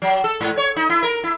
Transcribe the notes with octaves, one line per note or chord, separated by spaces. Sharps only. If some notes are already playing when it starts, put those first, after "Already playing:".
F#3
A4
G#2
C#5
D#4
E4
A#4
E4